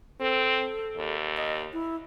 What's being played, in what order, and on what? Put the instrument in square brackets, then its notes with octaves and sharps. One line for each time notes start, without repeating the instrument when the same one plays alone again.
[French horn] C4 [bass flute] A4
[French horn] D#2
[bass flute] D#5
E4